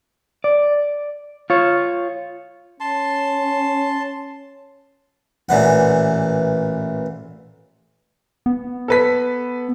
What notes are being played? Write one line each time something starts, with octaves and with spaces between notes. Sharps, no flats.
D5
F4 C#5
C#4 A5 C6
A1 A#2 E3 F#5
B3
A4 B4 B6